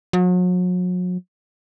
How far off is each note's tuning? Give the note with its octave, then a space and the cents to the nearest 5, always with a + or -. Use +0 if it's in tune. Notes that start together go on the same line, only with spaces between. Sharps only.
F#3 -40